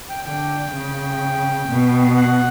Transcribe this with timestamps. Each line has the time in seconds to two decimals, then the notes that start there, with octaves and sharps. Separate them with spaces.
0.09 G5
0.25 D3 G5
0.72 C#3
1.68 B2
2.16 F#5